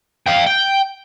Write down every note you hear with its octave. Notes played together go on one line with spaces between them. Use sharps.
F5 G5
G5